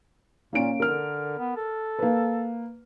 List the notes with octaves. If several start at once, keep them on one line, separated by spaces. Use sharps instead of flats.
A#2 A#3 C#4 D7
D3 A#4 F6
B3
A4
A#3 B4